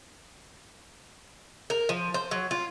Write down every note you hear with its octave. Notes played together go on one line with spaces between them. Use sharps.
A#4
F3
C5
F#3
F4